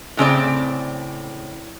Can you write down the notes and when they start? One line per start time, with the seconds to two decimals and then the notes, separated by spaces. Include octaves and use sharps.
0.17 A2 C#3 C4 D5